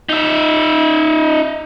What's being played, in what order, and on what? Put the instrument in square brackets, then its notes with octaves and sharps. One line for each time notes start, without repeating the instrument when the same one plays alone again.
[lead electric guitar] D#4 E5